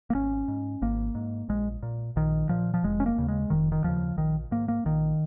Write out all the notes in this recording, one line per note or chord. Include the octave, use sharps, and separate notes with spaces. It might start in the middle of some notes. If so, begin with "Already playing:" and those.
A#3
G#1 C#4
G#2
G#1 A#3
G#2
A#1 G#3
A#2
A#1 D#3
A#2 F3
F3
F1 G#3
C#4
A#3
D#2 C#3
G#3
F1 D#3
D#3
D#2 C#3 F3
A#1 D#3
G#2 A#3
A#3
A#1 D#3